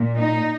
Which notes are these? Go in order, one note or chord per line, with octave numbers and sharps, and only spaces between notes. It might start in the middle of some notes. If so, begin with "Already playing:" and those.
Already playing: A#2
D#4